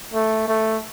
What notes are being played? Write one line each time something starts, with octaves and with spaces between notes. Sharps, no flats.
A3
A3